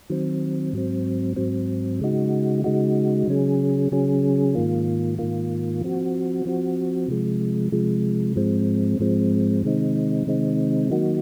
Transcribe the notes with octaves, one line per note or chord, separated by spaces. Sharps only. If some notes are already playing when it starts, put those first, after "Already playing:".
D#3 F#3 C4
G#2 F#3 C4
G#2 F#3 C4
C#3 G#3 D#4 F#4
C#3 G#3 D#4 F#4
C#3 F#3 C#4 G#4
C#3 F#3 C#4 G#4
G#2 D#3 A#3 F4
G#2 D#3 A#3 F4
F3 C4 F#4
F3 C4 F#4
C3 F3 G#3
C3 F3 G#3
G#2 F3 G#3 C4
G#2 F3 G#3 C4
C3 D#3 G#3 C4 D#4
C3 D#3 G#3 C4 D#4
D#3 F#3 A#3 D#4 F#4